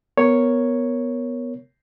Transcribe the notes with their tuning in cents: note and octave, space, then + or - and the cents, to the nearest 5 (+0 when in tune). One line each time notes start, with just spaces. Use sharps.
B3 +0 A#4 +0 C#5 +0